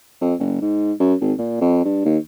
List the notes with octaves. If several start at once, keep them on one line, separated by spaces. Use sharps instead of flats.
F2
F#1
G#2
F#2
G#1
A#2
F2
G2
D#2